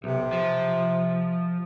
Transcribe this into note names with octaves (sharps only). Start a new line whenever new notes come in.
B1 C3
F3